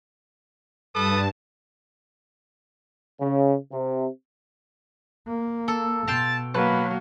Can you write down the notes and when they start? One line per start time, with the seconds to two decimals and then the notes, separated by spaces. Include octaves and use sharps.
0.94 G2 A4 B4 A5 D#6
3.20 C#3
3.71 C3
5.27 A#3
5.68 A4
6.07 B2 F5 G5 A5 C6
6.54 F#3 A#3 B4 A5